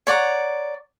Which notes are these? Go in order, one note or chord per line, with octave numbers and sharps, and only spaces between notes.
C#5 D5 F#5 A#5